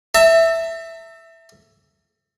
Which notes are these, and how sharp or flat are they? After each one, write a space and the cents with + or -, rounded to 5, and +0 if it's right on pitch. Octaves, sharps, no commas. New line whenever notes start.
E5 +0 A5 +45